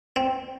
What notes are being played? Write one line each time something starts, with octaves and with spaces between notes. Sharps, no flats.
C4